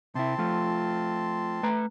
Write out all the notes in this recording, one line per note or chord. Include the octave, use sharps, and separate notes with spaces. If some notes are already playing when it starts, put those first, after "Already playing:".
C3 C4 E4 A5 C6
F3 A3 F4
A3 B4 A#5